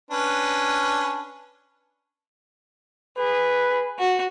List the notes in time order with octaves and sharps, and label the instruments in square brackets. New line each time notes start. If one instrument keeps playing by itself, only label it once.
[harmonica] C#4 D4 B4
[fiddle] G#4 [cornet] B4
[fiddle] F#4